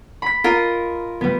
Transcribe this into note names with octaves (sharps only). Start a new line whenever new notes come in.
B5 B6
F4 A#4 D#5
G3 B3